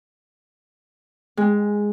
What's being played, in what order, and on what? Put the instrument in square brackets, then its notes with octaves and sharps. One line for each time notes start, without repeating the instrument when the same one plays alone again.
[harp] G#3